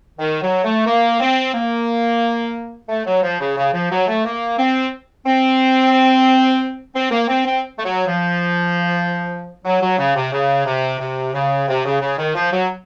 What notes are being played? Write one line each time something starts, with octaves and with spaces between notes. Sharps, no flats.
D#3
F#3
A3
A#3
C4
A#3
A3
F#3
F3
C#3
C#3
F3
F#3
A3
A#3
C4
C4
C4
A#3
C4
C4
A3
F#3
F3
F#3
F#3
C#3
C3
C#3
C3
C3
C#3
C3
C#3
C#3
D#3
F3
F#3